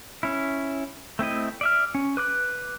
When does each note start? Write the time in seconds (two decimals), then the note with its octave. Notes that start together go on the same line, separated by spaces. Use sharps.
0.23 C#4 E4
1.19 A3 C4 E4 D#5
1.61 D5 E5 F6
1.95 C#4
2.17 B4 D6 F#6